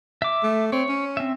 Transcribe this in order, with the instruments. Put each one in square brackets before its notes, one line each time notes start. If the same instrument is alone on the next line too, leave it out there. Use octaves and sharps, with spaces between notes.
[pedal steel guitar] E5 D6
[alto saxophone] A3
[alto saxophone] C4 [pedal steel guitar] C#5
[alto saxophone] C#4
[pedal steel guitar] C4 E5